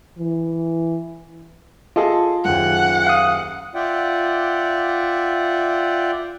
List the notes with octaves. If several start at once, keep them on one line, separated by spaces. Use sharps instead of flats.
E3
F4 G#4 A4 D#5
F#1 D#2 F#5
F5 D#6
F4 D5 E5 F#5 G5